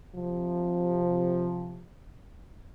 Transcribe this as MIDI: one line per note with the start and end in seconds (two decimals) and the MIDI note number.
0.16 1.86 48
0.16 1.86 53